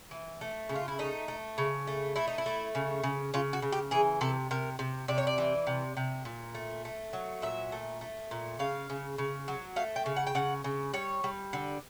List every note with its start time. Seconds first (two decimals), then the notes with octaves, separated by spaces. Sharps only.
0.11 E3
0.41 A3
0.69 C#3
0.75 F4
0.88 E4
0.99 A3 D#4
1.28 A3
1.58 C#3
1.87 A3
2.16 A3 E4
2.28 D#4
2.38 E4
2.46 A3
2.75 C#3
3.03 C#3
3.34 C#3 F4
3.53 F#4
3.62 C#3
3.72 G4
3.91 E3 G#4
4.21 C3 A4
4.51 C3 A#4
4.79 C3
5.08 C3 D5
5.18 C#5
5.27 D5
5.38 E3
5.67 C3
5.97 C3
6.25 A#2
6.55 A3
6.85 A3
7.13 F#3
7.42 A#2 E5
7.72 A3
8.01 A3
8.31 A#2
8.59 C#3 F5
8.90 C#3
9.18 C#3
9.48 F#3
9.76 A3 F5
9.96 G5
10.06 C#3
10.16 F#5
10.27 G5
10.35 C#3 F#5
10.64 C#3
10.93 G3 C#5
11.24 G3
11.53 D3